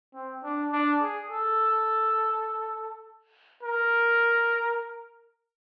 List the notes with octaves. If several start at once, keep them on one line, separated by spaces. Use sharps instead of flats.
C4
D4
D4
G#4
A4
A#4